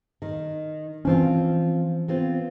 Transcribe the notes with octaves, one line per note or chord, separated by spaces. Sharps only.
D#3
E3 F3 C4 C#4 F4
B3 C4 F4